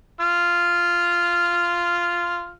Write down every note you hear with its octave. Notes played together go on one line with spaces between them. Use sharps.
F4 F6